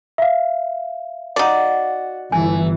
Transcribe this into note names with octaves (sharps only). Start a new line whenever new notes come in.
E5 F5
D#4 F#4 D5
G1 E3 A3 G#5